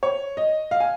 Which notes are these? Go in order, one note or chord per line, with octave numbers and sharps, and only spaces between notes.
C#5
D#5
F5
G#5